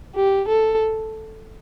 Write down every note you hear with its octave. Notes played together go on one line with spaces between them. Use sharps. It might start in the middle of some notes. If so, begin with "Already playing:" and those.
G4
A4